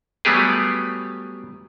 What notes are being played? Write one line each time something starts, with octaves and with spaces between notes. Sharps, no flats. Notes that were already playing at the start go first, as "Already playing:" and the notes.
F#3 G3 A3 B3 G4 G#4